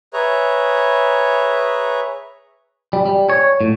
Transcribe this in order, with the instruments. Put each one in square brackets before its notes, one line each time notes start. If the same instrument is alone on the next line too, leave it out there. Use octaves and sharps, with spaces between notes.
[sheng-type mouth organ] G#4 B4 C#5 E5 A#5
[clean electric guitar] G3
G3
C#5
A2